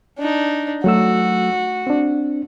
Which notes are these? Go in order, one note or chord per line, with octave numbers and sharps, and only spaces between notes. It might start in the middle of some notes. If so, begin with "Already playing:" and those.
D4 D#4
F#3 A3 F#4 E6
C4 D4